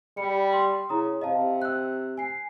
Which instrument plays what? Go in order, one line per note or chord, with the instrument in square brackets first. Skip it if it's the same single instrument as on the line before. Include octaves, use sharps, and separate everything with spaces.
[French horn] G3 [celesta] B5 C#7
[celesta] C6
[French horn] C#3 [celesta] E4 A#5 D#6
[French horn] C3 [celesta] D#5 F5 A5
[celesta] E6 F#6
G#5 C7